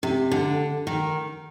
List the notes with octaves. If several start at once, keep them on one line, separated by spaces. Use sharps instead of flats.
C3
D3
D#3